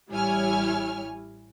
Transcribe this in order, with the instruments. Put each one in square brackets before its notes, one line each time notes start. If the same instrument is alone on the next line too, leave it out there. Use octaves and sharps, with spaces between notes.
[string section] A1 G3 E4 C#5 G#5 F6